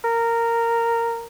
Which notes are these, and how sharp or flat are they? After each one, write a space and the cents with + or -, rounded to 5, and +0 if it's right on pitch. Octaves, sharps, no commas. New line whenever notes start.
A#4 -10